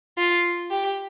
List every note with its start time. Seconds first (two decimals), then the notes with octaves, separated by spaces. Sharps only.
0.18 F4
0.71 G4